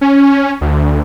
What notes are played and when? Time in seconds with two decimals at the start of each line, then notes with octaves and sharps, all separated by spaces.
0.01 C#4
0.61 D2